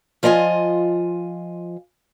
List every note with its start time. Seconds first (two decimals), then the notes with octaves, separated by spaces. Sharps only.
0.23 F3 F4 D#5 G5 G#5